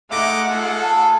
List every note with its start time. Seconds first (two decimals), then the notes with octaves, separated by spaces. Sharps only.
0.11 G#3 A3 D#4 E5 F#5 D6 A#6
0.49 F4 G#4 A4
0.81 A5